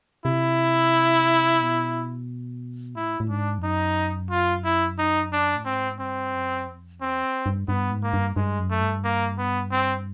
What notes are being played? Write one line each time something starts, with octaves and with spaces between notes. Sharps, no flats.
C3 E4
B2
A2 E4
A2
G#2 D4
F2
F#2 D#4
F4
E4
D#4
D4
A2
G#2 C4
G2 C4
F#2
F2
E2 C4
G2
G2 B3
G#2
A#3
G2
G2 G#3
F#2
A3
G2
A#3
B3
C4